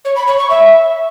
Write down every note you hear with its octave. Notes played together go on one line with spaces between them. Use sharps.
C#5
B5
C#5
C#6
E5